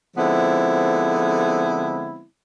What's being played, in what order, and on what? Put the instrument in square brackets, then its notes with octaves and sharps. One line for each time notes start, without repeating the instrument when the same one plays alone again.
[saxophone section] D3 F3 G#3 B3 C4 E4